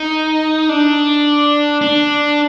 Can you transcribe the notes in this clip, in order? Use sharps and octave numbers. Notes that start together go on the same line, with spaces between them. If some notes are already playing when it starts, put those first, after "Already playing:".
Already playing: D#4
D4
D4